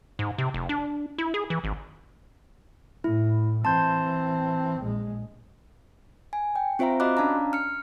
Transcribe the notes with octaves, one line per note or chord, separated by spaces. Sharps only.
G#2
C3
F1
D4
E4
G#4
E3
G#1
A2 E4
E3 C4 A5 C6 G6
A#1 G#3
G#5
G5
C4 F4 C5 E5 F5 A#5
F#4 D#5 F5 B5 D6 F#6
C#4 D4 F5 A5 A#5
F6 C#7